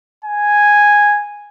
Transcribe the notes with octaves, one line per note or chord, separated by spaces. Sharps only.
G#5